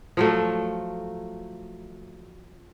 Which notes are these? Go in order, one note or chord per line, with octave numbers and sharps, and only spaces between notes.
F3 F#3 A3